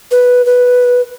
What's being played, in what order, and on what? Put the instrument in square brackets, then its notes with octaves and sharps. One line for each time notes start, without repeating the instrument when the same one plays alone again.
[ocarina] B4
B4